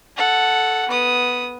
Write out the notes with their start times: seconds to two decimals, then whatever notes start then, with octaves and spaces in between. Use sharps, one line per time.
0.17 A4 F#5
0.89 B3 D#6